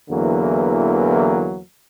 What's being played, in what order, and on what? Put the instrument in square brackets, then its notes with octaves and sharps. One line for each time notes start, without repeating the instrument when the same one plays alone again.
[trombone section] E2 D3 E3 F#3 A#3